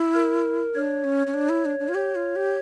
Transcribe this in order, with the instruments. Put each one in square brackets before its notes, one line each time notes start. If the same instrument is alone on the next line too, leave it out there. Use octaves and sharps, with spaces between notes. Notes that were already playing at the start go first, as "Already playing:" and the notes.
Already playing: [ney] E4
[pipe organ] A#4
[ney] D4 [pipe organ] C#5
[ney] C#4
C#4
D4
E4
D4
D4
F4
[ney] G4 [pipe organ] C#5
[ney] F4
G4